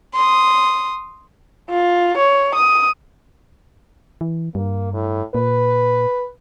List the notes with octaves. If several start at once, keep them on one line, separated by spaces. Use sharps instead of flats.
C6 D#6
F4
C#5
D#6
E3
G2 A#3
A2
A#2 B4